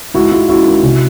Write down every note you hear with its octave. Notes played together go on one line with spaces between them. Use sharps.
G#2 E4 F#4
G#3 F4
C#4 E4 F#4
D#3
C3